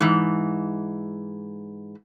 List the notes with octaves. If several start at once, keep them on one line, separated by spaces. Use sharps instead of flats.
G#2 E3